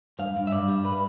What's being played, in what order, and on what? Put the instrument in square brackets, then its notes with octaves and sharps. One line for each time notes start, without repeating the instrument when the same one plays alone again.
[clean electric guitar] G2 F5
G2
E5
G2 D5
G3
B4